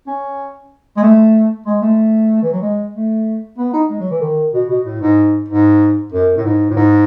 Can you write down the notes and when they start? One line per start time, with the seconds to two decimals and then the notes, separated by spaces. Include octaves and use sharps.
0.07 C#4
0.97 G#3
1.03 A3
1.66 G#3
1.82 A3
2.42 E3
2.52 F#3
2.62 G#3
2.93 A3
3.58 B3
3.73 D#4
3.90 G#3
4.00 F#3
4.10 E3
4.21 D#3
4.53 B2
4.69 B2
4.85 A2
5.01 G#2
5.49 G#2
6.12 F#2
6.37 A2
6.44 G#2
6.70 A2
6.76 G#2